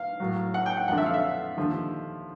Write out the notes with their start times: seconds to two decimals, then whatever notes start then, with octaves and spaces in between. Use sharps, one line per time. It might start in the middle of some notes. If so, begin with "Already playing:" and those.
Already playing: F5
0.20 A2 F#3
0.54 F#5
0.66 G5
0.77 F#5
0.88 F2 D3 F3 F#5
0.98 E5
1.06 F5
1.14 E5
1.57 D#2 D3 F3